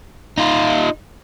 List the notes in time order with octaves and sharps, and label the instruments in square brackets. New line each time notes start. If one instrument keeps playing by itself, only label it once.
[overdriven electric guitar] D#4 F4